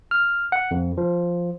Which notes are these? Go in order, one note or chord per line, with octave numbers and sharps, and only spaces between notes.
F6
F#5
F2
F3